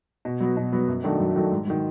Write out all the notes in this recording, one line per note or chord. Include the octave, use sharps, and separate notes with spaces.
B2
F#3 B3
B2
F#3 B3
F#2
D#3 F#3 A3 D4
F#2
D#3 F#3 A3 D4
G#2
D#3 F#3